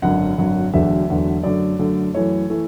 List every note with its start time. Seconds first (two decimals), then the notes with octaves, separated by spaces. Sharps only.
0.02 G#1 F#2 D3 F#3 F#5
0.38 G#1 F#2 D3 F#3
0.73 E1 E2 D3 F#3 A3 E5
1.08 E1 E2 D3 F#3 A3
1.43 F#2 D3 A3 D5
1.79 F#2 D3 A3
2.14 F#2 E3 A3 C#5
2.50 E3 A3